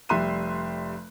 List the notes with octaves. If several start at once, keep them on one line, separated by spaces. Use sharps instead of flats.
F1 G3 E5 C6 F#6 D#7